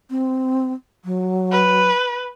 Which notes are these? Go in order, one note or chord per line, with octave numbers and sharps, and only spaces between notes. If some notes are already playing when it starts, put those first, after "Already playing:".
C4
F#3
B4